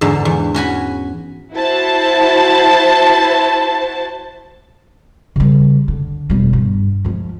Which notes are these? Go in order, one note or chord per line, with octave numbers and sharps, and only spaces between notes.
E2 G#2 D3
E2
C#4 F#4 G#5 B5
E4 F#4 C5 A5
C#3 G3
D3
E1 G3
G2
F3 G#3